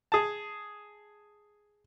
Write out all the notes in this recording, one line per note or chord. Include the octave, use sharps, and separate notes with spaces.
G#4 A5